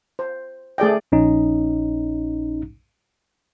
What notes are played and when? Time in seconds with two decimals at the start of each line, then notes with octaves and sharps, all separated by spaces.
0.19 C5
0.78 A3 G#4 D5 G5
1.12 A#1 C#4 D#4